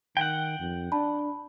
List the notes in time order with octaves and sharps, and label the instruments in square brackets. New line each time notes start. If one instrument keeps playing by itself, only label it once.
[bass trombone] D#3 [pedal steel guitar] F#5 G5
[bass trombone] F2
[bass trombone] D4 [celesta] A5 B5